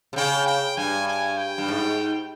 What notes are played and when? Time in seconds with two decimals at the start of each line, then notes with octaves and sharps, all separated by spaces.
0.13 C3
0.16 C#3 G5
0.47 G5
0.77 G2 G#5
1.08 G#5
1.38 G5
1.58 G2
1.68 G#2